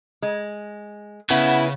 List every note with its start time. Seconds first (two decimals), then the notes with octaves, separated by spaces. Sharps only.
0.22 G#3
1.30 C#3 B3 E4 F#5